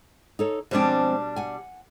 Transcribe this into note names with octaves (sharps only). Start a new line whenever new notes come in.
D#4 A4 C#5
B2 F3 G3 G#3 C4 D4
F#5 G#5